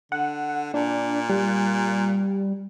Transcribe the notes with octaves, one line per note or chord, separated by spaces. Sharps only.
D3 F#5
A#2 D4
G3